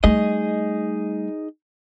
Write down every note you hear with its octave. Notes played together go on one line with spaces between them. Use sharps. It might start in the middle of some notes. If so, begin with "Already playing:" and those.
G3 A3 D#4 G#4 D#5